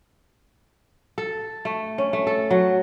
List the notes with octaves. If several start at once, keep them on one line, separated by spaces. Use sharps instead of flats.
A4
A3
C#4
A3
A4
F#3